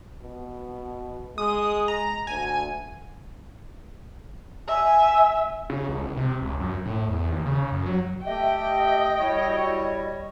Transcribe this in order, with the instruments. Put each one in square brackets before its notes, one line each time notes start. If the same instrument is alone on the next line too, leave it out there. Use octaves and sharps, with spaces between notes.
[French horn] B2
[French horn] G#3 [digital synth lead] D#6
[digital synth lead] A#5
[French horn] D2 [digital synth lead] G#5
[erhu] E5 [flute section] G#5
[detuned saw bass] C#3
C#2
C2
C3
C#2
F#2
A2
E2
D#2
C#3
F#2
F#3
[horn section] A3 G4 [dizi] D#5 [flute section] E5 [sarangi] G5
[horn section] G3 C#5 [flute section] E4 F#4